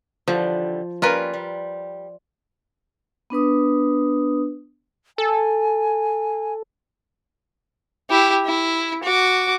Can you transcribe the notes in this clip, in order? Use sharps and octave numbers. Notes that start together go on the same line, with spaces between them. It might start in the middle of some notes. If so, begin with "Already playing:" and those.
D3 E3 F3 G3
G3 A#3 C#4 F4 A#4 B4
G3
B3 D4 B4 D#6
A4 G#5
E4 G4
E4
F#4 D6